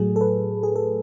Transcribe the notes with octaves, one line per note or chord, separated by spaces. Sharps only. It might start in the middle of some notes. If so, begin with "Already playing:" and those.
Already playing: A2 F#3 A3 G#4
A4
B4
G#4
A4